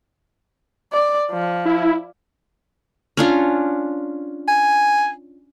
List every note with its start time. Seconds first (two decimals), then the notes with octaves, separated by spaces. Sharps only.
0.92 D5
1.32 F3
1.65 E4
3.17 C#4 D4 F4
4.48 G#5